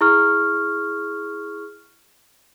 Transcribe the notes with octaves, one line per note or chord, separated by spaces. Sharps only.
E4 G#4 C#6 F6